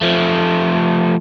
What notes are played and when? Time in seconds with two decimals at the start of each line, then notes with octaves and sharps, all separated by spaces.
0.01 F3 A3